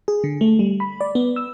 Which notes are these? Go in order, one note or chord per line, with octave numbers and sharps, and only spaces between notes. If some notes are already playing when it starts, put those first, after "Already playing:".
G#4
D3
A3
G3
B5
D5
B3
E6